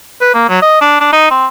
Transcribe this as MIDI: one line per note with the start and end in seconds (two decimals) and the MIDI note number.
0.21 0.31 71
0.35 0.45 58
0.49 0.59 54
0.62 0.80 75
0.81 0.97 62
1.01 1.08 62
1.13 1.29 63
1.31 1.47 60